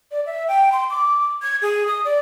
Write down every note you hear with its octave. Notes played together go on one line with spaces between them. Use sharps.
D5
E5
G5
C6
D6
G#6
G#4
D#6
D5